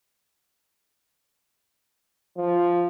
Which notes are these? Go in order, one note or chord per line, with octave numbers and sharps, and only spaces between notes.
F3